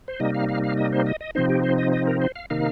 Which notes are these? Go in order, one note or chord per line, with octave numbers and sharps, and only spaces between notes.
C5
C3 G3 A#3 D#4 D#5
F5
F5
F5
D#5
C5
D#5
D#5
C3 F3 C4 D#4 C5
G4
C5
D#5
D#5
A#4
C5
F5
C3 D#3 A#3 D#4 F5